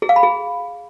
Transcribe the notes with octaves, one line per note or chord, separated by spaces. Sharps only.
G#4
F5
B5
G#4